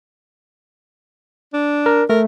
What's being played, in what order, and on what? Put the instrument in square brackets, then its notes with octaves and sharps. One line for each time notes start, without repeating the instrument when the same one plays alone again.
[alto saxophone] D4
[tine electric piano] A#4
[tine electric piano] A3 [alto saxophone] A#4